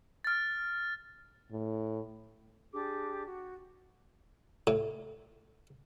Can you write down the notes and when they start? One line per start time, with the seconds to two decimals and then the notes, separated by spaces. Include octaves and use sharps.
0.24 F6 A6
1.52 A2
2.73 D4 G4 G#4 D6
3.26 F#4
4.67 A2